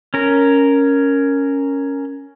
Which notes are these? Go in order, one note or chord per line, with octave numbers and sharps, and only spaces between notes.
C#4 A#4